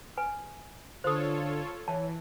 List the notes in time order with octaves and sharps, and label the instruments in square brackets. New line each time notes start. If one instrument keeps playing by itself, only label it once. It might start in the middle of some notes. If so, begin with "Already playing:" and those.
[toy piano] B4 G#5
[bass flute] D3 [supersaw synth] F4 A4 C#5 [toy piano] C5 D#6
[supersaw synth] E3 [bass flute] C#5 [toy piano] A5